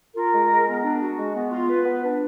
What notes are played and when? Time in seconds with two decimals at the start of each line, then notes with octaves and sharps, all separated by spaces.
0.15 F4 A#4
0.32 G#3
0.50 G#3
0.67 B3
0.84 D4
1.01 F#4
1.18 G#3
1.34 B3
1.51 F4
1.69 B4
1.85 B3
2.03 D4